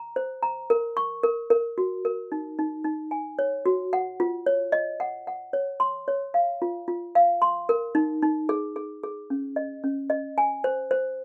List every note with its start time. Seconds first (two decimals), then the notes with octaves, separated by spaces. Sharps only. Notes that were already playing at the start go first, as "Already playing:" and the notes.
Already playing: A#5
0.16 C5
0.43 A#5
0.70 A#4
0.97 C#6
1.23 A#4
1.50 A#4
1.78 F#4
2.05 A#4
2.32 D#4
2.59 D#4
2.84 D#4
3.11 G#5
3.39 C#5
3.66 F#4
3.93 F#5
4.20 F4
4.46 C#5
4.72 D#5
5.00 F#5
5.27 F#5
5.53 C#5
5.80 C6
6.08 C#5
6.34 F5
6.62 F4
6.88 F4
7.15 F5
7.42 C6
7.69 A#4
7.95 D#4
8.22 D#4
8.49 G#4
8.76 G#4
9.03 G#4
9.30 C#4
9.56 D#5
9.84 C#4
10.10 D#5
10.38 G#5
10.64 C5
10.91 C5